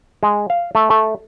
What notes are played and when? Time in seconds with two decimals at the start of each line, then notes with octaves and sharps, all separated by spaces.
0.23 G#3
0.50 F5
0.75 A3
0.90 A3